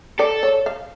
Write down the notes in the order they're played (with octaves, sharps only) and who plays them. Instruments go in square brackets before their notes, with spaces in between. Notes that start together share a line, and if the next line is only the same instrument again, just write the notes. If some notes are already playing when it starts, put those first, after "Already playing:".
[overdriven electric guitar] A4 [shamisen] D5
[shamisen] C#5
F5